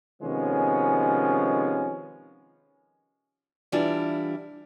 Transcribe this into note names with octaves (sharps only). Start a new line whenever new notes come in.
C3 D#3 F3 G#3 B3 C#4
E3 G3 D4 E4 F4 D5